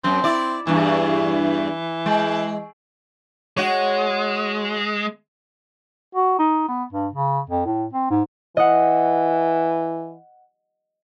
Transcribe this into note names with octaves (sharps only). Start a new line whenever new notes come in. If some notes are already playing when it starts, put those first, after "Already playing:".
F#2 C4
E4 D5
E2 G2 E3
G#3
G#3 F#4 C#5
F#4
D#4
B3
G2
C#3
F2
A2
C4
G#2
E3 D#5 F#5